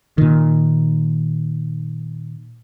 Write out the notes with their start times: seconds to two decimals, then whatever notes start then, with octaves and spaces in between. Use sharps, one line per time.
0.18 A#2 D#3